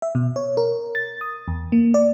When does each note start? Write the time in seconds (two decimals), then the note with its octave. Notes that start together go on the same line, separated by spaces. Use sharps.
0.02 E5
0.15 B2
0.36 C#5
0.57 A#4
0.95 A6
1.21 D#6
1.48 E2
1.72 A#3
1.94 D5